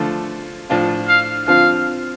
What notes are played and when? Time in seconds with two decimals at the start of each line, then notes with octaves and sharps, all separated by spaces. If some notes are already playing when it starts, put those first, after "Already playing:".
Already playing: D3 F3 A3 F4
0.70 A2 F3 D4 F4
1.08 F5
1.47 D3 F3 C4 F4 F5